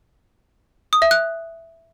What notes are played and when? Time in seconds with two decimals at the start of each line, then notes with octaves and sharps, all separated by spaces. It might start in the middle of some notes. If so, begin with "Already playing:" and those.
0.93 D#6
1.02 E5
1.11 F#6